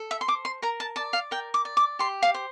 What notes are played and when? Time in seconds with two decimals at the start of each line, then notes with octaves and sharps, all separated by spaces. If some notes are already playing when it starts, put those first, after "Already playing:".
Already playing: A4
0.11 E5
0.21 C6
0.28 C5 D6
0.45 C6
0.62 A#4 A#5
0.80 A5
0.96 D5 A5
1.13 F5
1.31 A#4 G5
1.54 D6
1.65 D5
1.77 D6
1.99 G4 C6
2.23 F5
2.34 C5